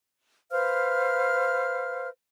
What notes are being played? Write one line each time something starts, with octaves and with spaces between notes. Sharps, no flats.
B4 C5 F5 F6